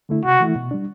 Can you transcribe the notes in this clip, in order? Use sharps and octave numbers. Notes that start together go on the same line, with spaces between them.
D3 A3 E4
C3 F#4
E3 A3 E4
B2
G3 D4